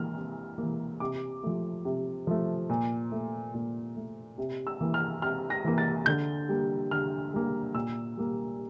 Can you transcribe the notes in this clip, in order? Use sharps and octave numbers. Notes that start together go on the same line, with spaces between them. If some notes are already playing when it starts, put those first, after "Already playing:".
Already playing: E3 A#3 F6
C3
E3 A#3
C3 D6
F3 A3
C3
F3 A3
A#2
A3
A#2
A3
C3
E6
E3 A#3
F6
C3 F6
A#6
E3 A#3
A6
D3 G6
G3 A#3
D3 F6
G3 A#3
A#2 E6
G3 A#3